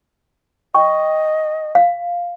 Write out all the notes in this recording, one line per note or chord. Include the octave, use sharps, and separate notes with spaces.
D#5 G5 C#6
F5